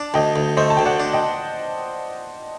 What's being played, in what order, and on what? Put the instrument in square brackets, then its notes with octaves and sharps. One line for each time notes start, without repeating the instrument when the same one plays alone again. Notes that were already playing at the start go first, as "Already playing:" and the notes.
Already playing: [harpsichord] D4 [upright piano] A5
[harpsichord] D2 [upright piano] D#5 G5
[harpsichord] D2
[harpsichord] A3 [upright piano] C5 D#5
[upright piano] A5
[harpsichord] D2 [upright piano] G5
[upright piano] D5 F#5
[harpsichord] D4
[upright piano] D#5 G5